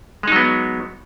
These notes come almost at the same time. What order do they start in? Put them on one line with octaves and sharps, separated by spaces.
G#3 D#4 F#3 B3